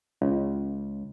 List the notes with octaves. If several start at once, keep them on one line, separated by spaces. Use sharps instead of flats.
C#2